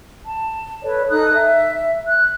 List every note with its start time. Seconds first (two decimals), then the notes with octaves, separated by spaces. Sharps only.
0.24 A5
0.83 A4 B4 C#5 D5
1.09 D#4 A4 D#6 F#6
1.33 E5
2.06 F#6